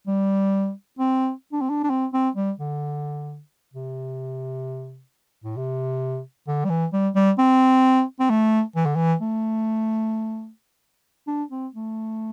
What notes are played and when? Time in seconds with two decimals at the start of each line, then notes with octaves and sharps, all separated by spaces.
0.07 G3
0.99 C4
1.53 D4
1.61 C4
1.69 D4
1.84 D4
1.90 C4
2.13 C4
2.35 G3
2.59 D3
3.74 C3
5.44 A2
5.57 C3
6.47 D3
6.65 G3
6.70 E3
6.93 G3
7.15 G3
7.38 C4
8.19 C4
8.30 A3
8.76 E3
8.85 D3
8.96 E3
9.21 A3
11.27 D4
11.51 C4
11.74 A3